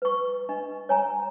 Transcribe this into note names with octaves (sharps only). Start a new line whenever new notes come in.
B4 C#6
D4 D#5
C#5 G#5 A#5